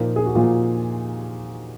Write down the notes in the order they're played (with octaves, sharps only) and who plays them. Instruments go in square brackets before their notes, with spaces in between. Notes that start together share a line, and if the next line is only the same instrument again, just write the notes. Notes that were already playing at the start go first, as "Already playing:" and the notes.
Already playing: [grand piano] A#2 F3 A#3 D#4
G#4
F#4
A#2 F3 A#3 F4